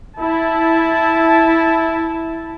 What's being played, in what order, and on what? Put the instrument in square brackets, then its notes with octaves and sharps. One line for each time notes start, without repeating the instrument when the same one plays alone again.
[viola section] E4 A5